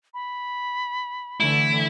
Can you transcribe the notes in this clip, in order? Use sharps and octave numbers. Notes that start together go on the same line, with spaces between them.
B5
D3 E3 A3 E4